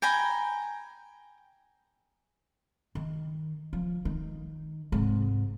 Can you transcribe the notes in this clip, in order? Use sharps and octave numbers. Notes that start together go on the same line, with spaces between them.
G5 G#5 A#5 B5
D#3
F3
D#3
G#2 C3